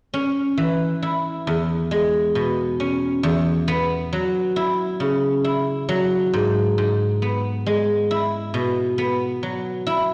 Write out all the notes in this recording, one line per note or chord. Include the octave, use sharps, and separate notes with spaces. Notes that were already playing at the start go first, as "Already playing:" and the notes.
C#4
E3
E4
E2
G#3
B2
C#4
E2
B3
F#3
E4
C#3
E4
F#3
G#2
G#2
B3
G#3
E4
B2
B3
F#3
E4